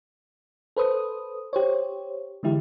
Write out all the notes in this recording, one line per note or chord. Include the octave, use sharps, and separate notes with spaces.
A4 B4 C5 D#6
G4 C5 C#5
D3 E3 G#3 E4 G4